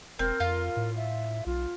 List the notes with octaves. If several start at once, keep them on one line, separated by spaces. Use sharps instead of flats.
E1 C4 A#4
F2 F4
A2
E5
B1 F4